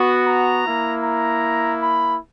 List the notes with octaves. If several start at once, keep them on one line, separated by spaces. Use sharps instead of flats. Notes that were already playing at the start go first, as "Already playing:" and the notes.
Already playing: B3 F#4
A#5
A#3 E4
A#5
B5